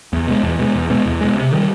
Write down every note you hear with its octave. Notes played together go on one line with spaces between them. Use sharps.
E2
B2 G#3
E2
B2 G#3
E2
B2 G#3
E2
B2 G#3
C3
D#3 G3